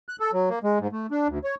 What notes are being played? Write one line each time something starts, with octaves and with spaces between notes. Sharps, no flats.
F#6
A4
F#3
A#3
G#3
G#2
A3
D4
D2
C#5